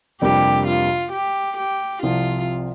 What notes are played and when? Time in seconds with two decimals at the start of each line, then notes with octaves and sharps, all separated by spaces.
0.21 F2 C3 G3 A#3 D4 G4
0.66 F4
1.12 G4
1.57 G4
2.02 C2 C3 F3 F4